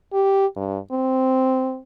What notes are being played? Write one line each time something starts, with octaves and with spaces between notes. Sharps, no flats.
G4
G2
C4